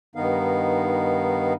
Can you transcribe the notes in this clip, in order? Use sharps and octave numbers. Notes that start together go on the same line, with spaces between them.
G2 D#3 B3 D#4 F5